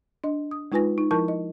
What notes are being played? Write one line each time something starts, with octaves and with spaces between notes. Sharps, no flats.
D4 D#5
D#6
G#3 D#4 F4 B4 G#5 A#6
D#4
F3 E4 A#4 A5 C#6 G6
D#5